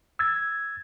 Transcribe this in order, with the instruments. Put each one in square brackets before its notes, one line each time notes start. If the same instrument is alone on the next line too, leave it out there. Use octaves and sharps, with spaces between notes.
[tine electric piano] E6 G#6 A6